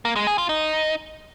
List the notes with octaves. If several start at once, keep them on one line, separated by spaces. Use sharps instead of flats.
A#3
G#3
G#4
F4
D#4